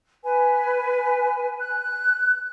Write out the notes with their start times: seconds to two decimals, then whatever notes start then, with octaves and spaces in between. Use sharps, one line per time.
0.23 B4 G#5
1.59 F#6